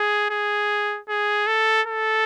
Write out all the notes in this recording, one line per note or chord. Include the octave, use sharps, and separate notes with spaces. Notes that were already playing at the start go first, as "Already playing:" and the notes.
Already playing: G#4
G#4
G#4
A4
A4